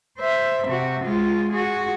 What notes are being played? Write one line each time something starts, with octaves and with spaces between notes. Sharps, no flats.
C5 E5
C3 F#4
G#3 F4
F#4 G#4